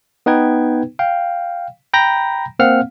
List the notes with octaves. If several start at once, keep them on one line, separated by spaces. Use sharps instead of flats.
B3 D#4 B4 G5 G#6
F5 G5
G5 A#5 B5 G6 A#6
A#3 C4 F5 F#5 F6